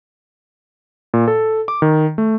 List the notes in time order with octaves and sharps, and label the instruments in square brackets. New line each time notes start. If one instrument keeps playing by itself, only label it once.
[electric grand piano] A#2
A4
D6
D#3
A3